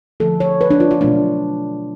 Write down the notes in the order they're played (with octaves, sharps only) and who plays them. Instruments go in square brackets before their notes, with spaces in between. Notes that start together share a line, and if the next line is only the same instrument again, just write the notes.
[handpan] D3 F3 A3 A4
C#5
B4
D4
F4
F4
B2 F#3 A3 D4